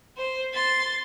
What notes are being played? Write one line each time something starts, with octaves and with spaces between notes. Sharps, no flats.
C5
C6 A6